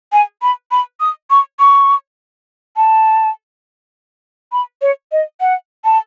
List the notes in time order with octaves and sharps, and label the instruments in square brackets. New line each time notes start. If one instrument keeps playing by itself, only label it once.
[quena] G#5
B5
B5
D#6
C#6
C#6
A5
B5
C#5
D#5
F#5
A5